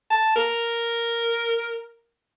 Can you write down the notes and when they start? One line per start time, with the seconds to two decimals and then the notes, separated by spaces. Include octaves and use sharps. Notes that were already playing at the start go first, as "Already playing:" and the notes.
0.10 A5
0.35 A#4